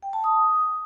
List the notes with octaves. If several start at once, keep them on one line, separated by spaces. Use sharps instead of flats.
G5
A5
D#6